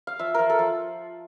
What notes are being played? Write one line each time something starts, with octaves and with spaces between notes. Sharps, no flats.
F5
F3 E5
F3 A#4
A4
F3